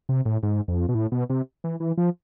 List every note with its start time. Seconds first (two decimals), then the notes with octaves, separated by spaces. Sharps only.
0.09 C3
0.25 A2
0.43 G#2
0.68 F2
0.89 B2
0.95 A2
1.12 B2
1.30 C3
1.64 E3
1.80 E3
1.97 F3